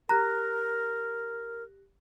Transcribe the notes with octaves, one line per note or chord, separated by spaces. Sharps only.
G4 A#4 A#5 F#6 A#6